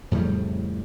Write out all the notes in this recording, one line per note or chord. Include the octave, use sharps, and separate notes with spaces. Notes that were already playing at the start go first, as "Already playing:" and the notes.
F2 A2 C#3 G3